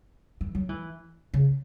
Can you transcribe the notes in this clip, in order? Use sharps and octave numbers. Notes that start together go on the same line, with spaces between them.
E3
F#3
E3
C#3